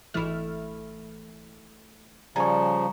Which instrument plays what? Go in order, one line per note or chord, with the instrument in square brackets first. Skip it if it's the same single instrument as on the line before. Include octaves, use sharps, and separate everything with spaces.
[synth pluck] G#1 E3 F6 [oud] A3 E4
[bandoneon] C#3 F3 [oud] G3 [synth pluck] G#5 [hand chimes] A#5 C#6